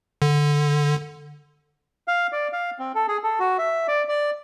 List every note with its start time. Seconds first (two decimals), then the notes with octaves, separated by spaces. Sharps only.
0.22 D3
2.08 F5
2.32 D5
2.53 F5
2.79 C4
2.95 A4
3.08 G#4
3.23 A4
3.40 F#4
3.58 E5
3.88 D5
4.09 D5